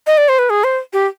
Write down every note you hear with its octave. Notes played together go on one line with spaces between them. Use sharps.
D#5
D5
C5
B4
G#4
C5
G4